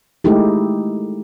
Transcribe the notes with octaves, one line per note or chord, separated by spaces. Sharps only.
G#3 A3 D#4 E4 G4